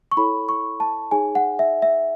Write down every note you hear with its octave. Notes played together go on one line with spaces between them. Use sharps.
C#6
E4 A4 C#5 B5
C#6
A5
D#4 G#4 C#5 G#5
F#5
E5
E5